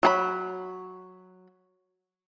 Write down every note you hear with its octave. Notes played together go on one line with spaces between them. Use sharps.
F#3 G#4 B5